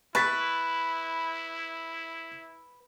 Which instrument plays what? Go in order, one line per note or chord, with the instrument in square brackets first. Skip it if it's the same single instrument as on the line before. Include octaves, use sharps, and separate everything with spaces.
[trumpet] E4 [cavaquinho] B4 [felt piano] C#6 A6 B6